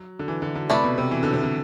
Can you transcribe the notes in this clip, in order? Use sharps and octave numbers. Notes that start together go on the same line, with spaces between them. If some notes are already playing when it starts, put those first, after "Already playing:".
Already playing: F#3
D3
E3
D3
D3
C3 A3 E4 B4 D5
B2
C3
E3
D3
C3
D3